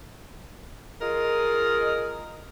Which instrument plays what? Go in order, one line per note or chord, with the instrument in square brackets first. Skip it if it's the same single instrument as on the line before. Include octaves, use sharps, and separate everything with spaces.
[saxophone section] F4 G#4 A#4 D#5